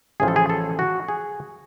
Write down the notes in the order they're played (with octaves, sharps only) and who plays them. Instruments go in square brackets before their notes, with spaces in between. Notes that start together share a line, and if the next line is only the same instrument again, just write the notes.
[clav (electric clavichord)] A1 A2 F3 G#4
A4
G#4
A4
F#4
G#4